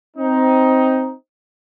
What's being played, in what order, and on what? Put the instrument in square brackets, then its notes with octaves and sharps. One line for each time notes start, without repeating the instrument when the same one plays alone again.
[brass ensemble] C4 D#4